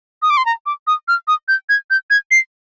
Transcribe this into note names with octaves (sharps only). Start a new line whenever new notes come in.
D#6
D6
C6
A#5
D6
D#6
F6
D#6
G6
G#6
G6
G#6
C7